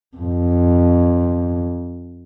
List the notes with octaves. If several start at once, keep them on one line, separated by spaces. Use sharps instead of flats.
F2